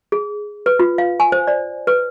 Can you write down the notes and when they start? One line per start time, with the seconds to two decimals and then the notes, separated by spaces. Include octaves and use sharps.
0.12 G#4
0.66 B4
0.79 F4
0.98 F5
1.20 G#5
1.32 C5
1.47 D5
1.87 B4